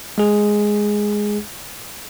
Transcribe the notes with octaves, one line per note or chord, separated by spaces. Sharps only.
G#3 G#4